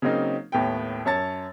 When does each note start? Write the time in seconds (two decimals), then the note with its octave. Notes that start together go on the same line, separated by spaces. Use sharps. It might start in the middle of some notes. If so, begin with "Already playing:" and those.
0.02 C#3 F#3 A#3 C4 D#4
0.52 D#2 A2 B3 G5
1.05 F#2 C#5 A5 A6